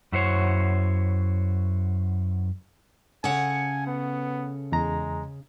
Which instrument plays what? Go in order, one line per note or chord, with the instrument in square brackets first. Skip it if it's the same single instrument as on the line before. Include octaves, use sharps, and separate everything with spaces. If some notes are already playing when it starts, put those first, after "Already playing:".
[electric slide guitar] F#2 E4 F#4 C5 C#5
[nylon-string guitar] C#3 [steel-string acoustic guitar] A4 C#5 F#5 [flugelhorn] G#5
[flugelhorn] B3
[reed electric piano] E2 A#5 [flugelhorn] G#3